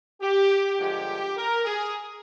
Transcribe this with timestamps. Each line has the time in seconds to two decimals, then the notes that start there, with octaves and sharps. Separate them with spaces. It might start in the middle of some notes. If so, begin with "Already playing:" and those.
0.22 G4
0.79 G2 D3 F3 G#3 G4
1.37 A#4
1.65 G#4